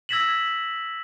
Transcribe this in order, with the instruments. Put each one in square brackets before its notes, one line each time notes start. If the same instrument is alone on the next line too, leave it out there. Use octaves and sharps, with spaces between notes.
[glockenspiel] E6 G#6 A#6 B6 E7 F#7